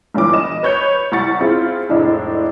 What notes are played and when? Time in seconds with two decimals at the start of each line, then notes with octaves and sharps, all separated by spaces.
0.14 G1 G2 A#2 E3 D6
0.33 D#5 E7
0.63 B4 C#5 G6 C#7
1.12 C2 F#5 C#6 A6 C#7
1.41 C4 E4 F4 G#4
1.89 F1 A2 G#3 D4 E4